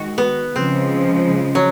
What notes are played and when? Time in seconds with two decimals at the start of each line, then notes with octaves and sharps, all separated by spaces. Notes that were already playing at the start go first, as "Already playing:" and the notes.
Already playing: D#3 G#3 F#4
0.18 B3
0.55 C#3 F3 G#3 C4
1.55 F#3